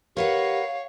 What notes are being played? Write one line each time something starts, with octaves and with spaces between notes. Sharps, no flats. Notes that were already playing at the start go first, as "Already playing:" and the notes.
G4 A#4 B4 C#5 F5 F#5